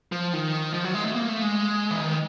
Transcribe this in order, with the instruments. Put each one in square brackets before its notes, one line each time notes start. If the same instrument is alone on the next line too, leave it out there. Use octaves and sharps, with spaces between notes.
[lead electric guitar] F3
D#3
F3
F#3
G#3
A3
A#3
A3
G#3
E3
D#3